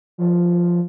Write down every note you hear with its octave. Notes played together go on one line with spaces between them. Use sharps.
F3